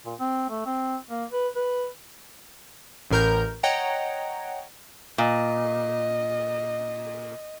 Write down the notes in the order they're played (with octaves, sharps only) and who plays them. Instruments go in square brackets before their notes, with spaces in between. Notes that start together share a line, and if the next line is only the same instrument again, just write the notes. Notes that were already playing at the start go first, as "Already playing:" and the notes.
[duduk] A#2
C4
A3
C4
A#3
B4
B4
[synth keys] A1 A2 A#4 A#5 G6
C#5 D#5 F#5 G5 A#5
[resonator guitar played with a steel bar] A#2 [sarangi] D#5